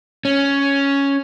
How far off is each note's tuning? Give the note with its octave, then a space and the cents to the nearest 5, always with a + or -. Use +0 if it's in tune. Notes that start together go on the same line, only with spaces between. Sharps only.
C#4 +5